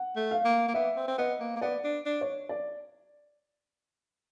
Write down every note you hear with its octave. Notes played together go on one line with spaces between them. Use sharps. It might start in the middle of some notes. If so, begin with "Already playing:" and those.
Already playing: F#5
A3
F5
A#3
A#3
B3 E5
C4
C4
B3 D#5
A#3
A#3
B3 D5
D4
D4
C#5
D5